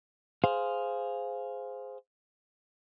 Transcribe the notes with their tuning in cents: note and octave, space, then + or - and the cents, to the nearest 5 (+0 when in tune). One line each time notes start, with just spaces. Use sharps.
G#4 +0 C5 -5 F5 +0